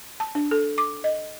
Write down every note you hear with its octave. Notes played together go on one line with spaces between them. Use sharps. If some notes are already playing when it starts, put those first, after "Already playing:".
A5
D4
A4
D6
D#5